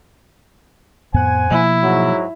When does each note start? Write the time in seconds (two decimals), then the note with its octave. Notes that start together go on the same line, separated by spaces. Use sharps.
1.14 F2 A2 B3 C5 F#5 G#5
1.50 B2 F3 A#3 E4
1.82 G#2 F#3